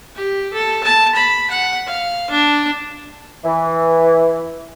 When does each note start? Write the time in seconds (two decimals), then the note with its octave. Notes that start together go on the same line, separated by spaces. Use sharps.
0.15 G4
0.53 A4
0.84 A5
1.15 B5
1.50 F#5
1.87 F5
2.30 D4
3.45 E3